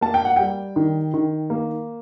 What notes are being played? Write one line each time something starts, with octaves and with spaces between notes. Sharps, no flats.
A#3 A5
G5
F#5
G3 G5
D#3
D#3
A#3